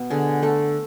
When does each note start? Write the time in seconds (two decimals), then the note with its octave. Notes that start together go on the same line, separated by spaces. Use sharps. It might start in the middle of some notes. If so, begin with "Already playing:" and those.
Already playing: B2 B3
0.10 D3 G#4
0.42 A3 A4